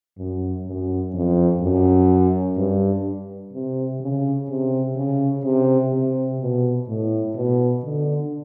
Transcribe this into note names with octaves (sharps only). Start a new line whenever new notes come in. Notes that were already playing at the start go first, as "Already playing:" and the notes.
F#2
F#2
F2
F#2
G2
C3
C#3
C3
C#3
C3
C3
B2
A2
B2
D3